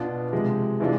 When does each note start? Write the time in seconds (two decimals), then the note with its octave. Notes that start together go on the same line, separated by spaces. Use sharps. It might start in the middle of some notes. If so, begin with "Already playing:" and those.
Already playing: B2 B3 D4 F4
0.32 C3 F3 G#3
0.80 C3 E3 G#3 D4 F4